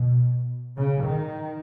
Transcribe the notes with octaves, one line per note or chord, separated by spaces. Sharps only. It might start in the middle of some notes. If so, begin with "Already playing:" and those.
Already playing: B2
C#3
D#3